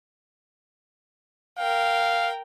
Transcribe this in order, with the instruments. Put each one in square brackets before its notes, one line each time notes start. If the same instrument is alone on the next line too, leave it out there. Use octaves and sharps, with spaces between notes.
[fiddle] A#4 G5 [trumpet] F5